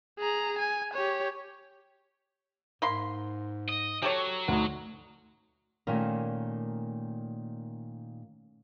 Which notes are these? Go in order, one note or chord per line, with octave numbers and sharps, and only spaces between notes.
G#4 A#5
G#5
G4 C#5
G#2 A#3 B5 C6
D#5
F#3 G4 A4 C#5
D2 D#4
A#2 D#3 A3 C#4 A#4